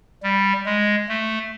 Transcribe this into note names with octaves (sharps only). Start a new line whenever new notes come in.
G3
G#3
A3